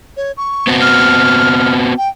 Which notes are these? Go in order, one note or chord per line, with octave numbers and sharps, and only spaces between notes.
C#5
C#6
B3 C4 F#4
F6
G5